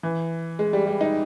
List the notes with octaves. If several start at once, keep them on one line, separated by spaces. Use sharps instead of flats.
E3
G#3
G3
G3
D#4